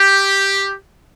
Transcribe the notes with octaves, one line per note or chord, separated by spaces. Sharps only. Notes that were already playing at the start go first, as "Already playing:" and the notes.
Already playing: G4